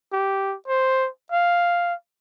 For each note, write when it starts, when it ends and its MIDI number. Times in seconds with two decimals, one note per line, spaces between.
0.13 0.56 67
0.68 1.08 72
1.32 1.94 77